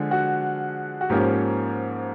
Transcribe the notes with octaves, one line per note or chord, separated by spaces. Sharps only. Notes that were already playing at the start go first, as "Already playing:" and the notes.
Already playing: D3 F3 G#3
F#4
F#4
G#2 F3 A#3 C#4 G4